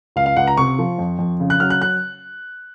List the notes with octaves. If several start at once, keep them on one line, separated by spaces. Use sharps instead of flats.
C#2 F5
F5
C#2 F#5
A#5
C3 C#6
F3
F2
F2
C#3
F#6
F#3 F6
F#6
F#6